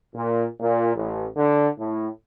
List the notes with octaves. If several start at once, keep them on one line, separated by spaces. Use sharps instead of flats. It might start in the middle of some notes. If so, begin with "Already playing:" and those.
A#2
A#2
A1
D3
A2